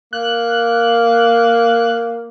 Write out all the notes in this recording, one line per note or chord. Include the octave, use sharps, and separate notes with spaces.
A#3 F#6